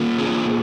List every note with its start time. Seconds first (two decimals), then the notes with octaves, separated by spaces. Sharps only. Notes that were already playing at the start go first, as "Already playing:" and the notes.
Already playing: D#3 A#3 F4
0.18 G#4